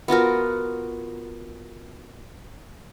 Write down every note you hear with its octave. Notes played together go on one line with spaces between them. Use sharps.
B3 F4 F#4 A#4